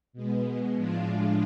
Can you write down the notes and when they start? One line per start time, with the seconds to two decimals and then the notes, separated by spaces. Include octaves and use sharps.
0.13 B2 G#3 B3
0.75 A2 F3 G#3 D4 F4